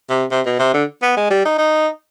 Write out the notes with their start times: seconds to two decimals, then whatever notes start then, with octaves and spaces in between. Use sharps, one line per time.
0.10 C3
0.31 C3
0.46 B2
0.59 C3
0.74 D3
1.02 B3
1.17 G#3
1.30 G3
1.45 D#4
1.58 D#4